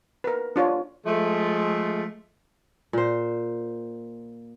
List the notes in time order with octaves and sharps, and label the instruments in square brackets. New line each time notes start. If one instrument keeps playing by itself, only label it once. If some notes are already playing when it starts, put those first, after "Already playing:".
[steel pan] A#4 B4
D4 F4 C#5 D5
[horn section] F3 G#3 A3
[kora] A#2 C5